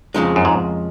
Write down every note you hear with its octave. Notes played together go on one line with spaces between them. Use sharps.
F2 C#3 F3 G#3 D#4
F#2
G#2